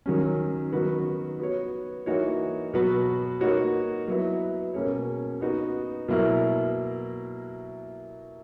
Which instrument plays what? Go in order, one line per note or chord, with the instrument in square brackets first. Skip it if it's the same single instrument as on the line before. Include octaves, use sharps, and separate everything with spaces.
[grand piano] D#3 F#3 C#4
D#3 F#3 B3 F#4 B4
B3 F#4 C#5
E3 A#3 D#4 F#4 C#5
B2 F#3 B3 F#4 B4
A#3 D#4 F#4 C#5
F#3 B3 E4 B4
B2 A#3 C#4 G#4 C#5
B3 D#4 F#4
B2 F#3 A#3 E4 A#4